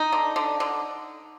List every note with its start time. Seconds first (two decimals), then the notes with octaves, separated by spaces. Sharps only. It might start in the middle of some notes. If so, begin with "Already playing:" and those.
Already playing: D#4
0.12 D3
0.36 D3
0.60 D3